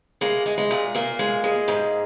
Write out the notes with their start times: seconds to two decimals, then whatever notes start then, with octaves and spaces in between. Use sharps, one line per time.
0.21 G#3 A#3
0.46 G#3
0.58 G#3
0.71 A#2
0.95 A#2 A#3
1.19 G#3
1.44 G#3
1.68 G#2